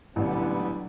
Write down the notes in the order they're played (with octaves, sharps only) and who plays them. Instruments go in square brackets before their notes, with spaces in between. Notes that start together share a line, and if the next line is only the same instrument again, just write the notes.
[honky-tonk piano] A1 [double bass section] A#2 D3 F#3 [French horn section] G3 B3